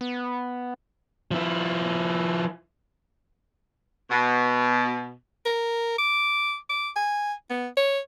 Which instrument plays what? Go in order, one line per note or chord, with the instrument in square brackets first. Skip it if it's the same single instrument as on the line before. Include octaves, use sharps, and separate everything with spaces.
[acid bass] B3
[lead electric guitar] F3 E4
[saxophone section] B2
[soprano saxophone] A#4
D6
D6
G#5
B3
C#5